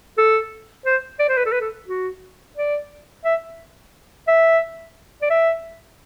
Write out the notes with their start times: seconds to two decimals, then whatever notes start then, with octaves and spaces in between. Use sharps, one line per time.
0.18 A4
0.86 C5
1.19 D5
1.29 C5
1.37 B4
1.46 A4
1.52 B4
1.60 A4
1.88 F#4
2.57 D5
3.25 E5
4.28 E5
5.22 D5
5.30 E5